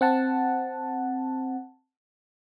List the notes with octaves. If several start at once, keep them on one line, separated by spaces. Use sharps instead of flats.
C4 F#5 A5